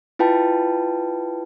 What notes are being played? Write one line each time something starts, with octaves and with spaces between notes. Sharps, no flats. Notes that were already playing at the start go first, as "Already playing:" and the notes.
E4 F4 B4 G5 A5